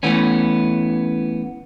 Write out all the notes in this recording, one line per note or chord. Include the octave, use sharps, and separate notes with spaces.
E3 A3 B3 C#4